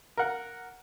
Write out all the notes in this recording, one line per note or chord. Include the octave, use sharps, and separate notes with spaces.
A#4 F#5